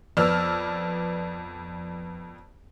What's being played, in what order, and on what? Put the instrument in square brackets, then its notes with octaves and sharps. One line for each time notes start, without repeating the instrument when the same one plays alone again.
[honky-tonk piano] F2 B3 D5 E6 F6